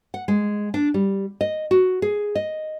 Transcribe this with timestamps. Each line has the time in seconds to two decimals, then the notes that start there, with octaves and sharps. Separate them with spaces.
0.14 F#5
0.28 G#3
0.74 D4
0.94 G3
1.41 D#5
1.71 F#4
2.02 G#4
2.35 D#5